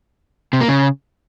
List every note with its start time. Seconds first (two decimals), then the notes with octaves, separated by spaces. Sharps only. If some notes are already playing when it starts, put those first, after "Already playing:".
0.53 C3
0.61 A#3
0.68 C#3